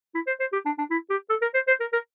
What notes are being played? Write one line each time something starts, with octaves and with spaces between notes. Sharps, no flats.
E4
C5
C5
G4
D4
D4
E4
G4
A4
A#4
C5
C5
A#4
A#4